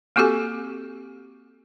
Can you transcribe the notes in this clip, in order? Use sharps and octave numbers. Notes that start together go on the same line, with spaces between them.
A#3 C4 F#4 G4 A4 G#5